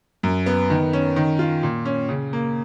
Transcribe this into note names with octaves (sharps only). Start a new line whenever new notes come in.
F#2
B3
D#3
C#4
D#3
F4
A#2
C#4
C#3
A#3